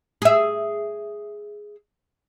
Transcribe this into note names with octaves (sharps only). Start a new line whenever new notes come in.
G#4 E5